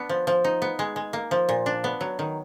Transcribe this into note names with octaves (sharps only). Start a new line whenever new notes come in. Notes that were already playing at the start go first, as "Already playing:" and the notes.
Already playing: B3 D4
F3
F3
D#4
B3
G#3
G#3
A#3
F3
A#2
D4
B3
F#3
D#3